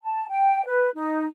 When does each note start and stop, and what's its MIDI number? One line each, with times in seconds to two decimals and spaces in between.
0.03 0.28 81
0.29 0.64 79
0.67 0.90 71
0.95 1.27 63